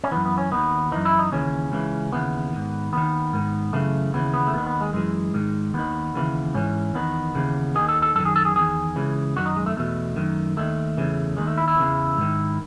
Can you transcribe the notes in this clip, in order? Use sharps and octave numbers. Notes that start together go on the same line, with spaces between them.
C#4
F#2 E3 B3
B3
C#4
D#2 D#3 B3
F#2 E3 D#4
E4
D#4
D#2 C#3 E3 C#4
C#2 C#3 E3
D#2 C#3 E3 B3
G#2 D#3
D#2 D#3 B3
G#2 D#3
F#2 C#3 E3 A3
D#2 C#3 E3 B3
B3
A3
D#2 D#3 B3
B3
G#3
F#2 E3 G#3
G#2 D#3
D#2 D#3 B3
D#2 C#3 E3
G#2 E3 C#4
E2 D#3 B3
D#2 C#3 E3
D#2 D#3 G#4
A4
A4
F#2 D#3 A4
G#4
A4
G#4
E2 D#3 G#4
C#2 C#3 E3
F#2 D#3 F#4
D#4
G#3
A3
E2 B2 A3
F#2 D#3
D#2 D#3 A3
E2 C#3 E3
D#2 D#3 G#3
A3
E4
E4
E2 C#3 E3
G#2 D#3